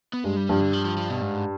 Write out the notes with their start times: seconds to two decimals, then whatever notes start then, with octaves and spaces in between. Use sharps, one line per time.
0.13 B3
0.24 G2 G#3
0.37 G3
0.49 G2 F3
0.61 D3
0.73 F3
0.85 F3
0.97 F3
1.10 B2
1.22 G#2